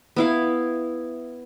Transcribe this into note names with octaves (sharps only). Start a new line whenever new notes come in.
B3 E4 F5